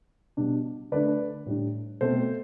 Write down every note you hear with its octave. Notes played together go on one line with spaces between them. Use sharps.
B2 G3 D4
D3 A3 D4 B4 D5
A2 G3 D4
B2 A3 C4 A4 C5